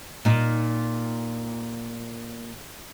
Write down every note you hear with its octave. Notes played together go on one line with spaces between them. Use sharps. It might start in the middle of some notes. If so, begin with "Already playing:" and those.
A#2 D#4